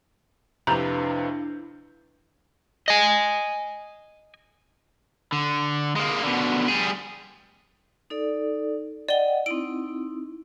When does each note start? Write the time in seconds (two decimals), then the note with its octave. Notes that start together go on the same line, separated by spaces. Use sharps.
0.67 F2 C3 D4 E4 F4 B4 A#5 G6
2.88 D#5 G#5
5.32 D3
5.96 G#3 A#3
6.23 B2 D3
6.68 G3 G#4
8.10 D#4 A4 D5
9.09 D5 D#5 F#5 G5 G7
9.46 C4 D#4 E4 D7